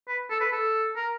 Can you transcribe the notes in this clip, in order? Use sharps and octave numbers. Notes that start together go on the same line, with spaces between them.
B4
A4
B4
A4
A#4